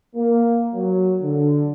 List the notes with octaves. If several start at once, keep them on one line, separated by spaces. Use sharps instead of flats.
A#3
F#3
D3